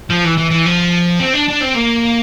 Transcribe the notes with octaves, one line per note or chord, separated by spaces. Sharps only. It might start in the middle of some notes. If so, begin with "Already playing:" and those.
F3
E3
E3
E3
F3
C4
D4
D4
C4
A#3